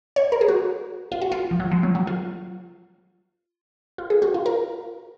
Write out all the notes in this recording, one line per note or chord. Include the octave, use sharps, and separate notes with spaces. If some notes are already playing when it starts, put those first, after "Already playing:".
C#5
A#4
G#4
F#4
F4
F#4
F4
F3
F#3
F3
F#3
F#3
F4
F4
G#4
F#4
F4
A#4